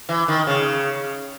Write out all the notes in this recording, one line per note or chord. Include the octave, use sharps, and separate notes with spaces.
E3
D#3
C#3